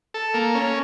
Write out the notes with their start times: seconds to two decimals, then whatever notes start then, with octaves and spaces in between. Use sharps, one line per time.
0.14 A4
0.34 A#3
0.55 C#4